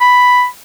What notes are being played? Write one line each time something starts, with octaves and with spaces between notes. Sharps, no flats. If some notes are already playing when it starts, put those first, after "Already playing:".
B5